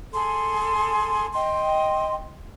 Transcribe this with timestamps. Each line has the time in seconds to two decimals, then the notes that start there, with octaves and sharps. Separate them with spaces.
0.14 G#4 A4 C6
1.34 D#5 G5 C6